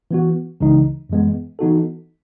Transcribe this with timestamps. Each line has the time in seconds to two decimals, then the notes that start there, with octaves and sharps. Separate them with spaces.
0.11 E3 B3 F#4
0.60 C#2 C#3 E3 G#3 D#4
1.10 F#2 E3 G#3 B3
1.59 E3 B3 D#4 F#4 A4